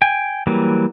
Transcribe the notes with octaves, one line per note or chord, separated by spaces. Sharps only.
G5 G#5
E3 F#3 G3 A#3